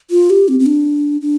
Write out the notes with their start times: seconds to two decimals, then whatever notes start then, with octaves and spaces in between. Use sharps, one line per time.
0.11 F4
0.30 G4
0.48 C4
0.60 C4
0.66 D4
1.21 D4